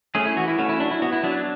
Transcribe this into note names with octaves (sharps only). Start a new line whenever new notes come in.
A3 C#4 G#4
E4
E3 F#4
E4
A3 C#4 F#4
E4
F#3 D4
E4
B3 F#4
E4
F#3 D4